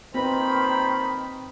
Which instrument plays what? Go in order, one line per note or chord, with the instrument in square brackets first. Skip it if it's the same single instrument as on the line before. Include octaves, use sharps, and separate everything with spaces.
[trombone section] A#2 C5 [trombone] D#3 [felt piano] C4 B4 [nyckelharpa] B5